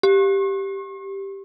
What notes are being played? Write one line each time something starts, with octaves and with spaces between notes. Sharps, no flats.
G4